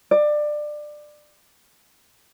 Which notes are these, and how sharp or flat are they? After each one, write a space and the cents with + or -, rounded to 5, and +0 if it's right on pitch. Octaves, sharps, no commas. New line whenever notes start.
D5 +20